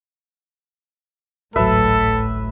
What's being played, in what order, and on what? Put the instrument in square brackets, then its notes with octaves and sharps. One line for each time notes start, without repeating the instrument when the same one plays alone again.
[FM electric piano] G#1 C#2 F#3 [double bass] A2 [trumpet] A4 [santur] B4 E5